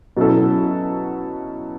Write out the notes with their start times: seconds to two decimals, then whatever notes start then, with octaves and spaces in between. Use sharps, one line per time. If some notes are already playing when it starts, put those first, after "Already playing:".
0.17 B2 F#3 C#4 E4 A4